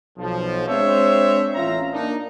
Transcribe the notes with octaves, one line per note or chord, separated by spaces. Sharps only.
B1 F3
G#3 C4 D4 C5 C#5 E5
A1 C#4 F4 E5 A#5
A#3 D4 D#4